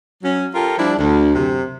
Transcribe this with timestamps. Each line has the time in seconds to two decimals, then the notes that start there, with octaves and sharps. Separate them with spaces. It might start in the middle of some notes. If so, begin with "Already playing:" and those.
0.23 F#3 C#4
0.54 F4 G4 A4 A#4
0.77 F3 G3 D4 E4
0.98 D2
1.35 F#2 C3